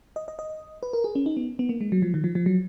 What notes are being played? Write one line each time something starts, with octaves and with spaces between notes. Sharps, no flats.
D#5
D#5
D#5
B4
A#4
G#4
C#4
D#4
B3
B3
A#3
G#3
F#3
F3
D#3
F3
F3
F#3